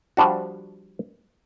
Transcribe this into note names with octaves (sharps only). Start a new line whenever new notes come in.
F3 G3 D4 F#4